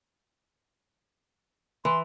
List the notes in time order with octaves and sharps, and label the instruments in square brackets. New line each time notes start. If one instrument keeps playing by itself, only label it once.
[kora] E3 [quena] C6